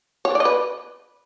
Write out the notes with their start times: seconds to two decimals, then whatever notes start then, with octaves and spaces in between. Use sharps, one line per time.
0.25 C#5
0.30 D4
0.35 D5
0.40 D#5
0.45 B4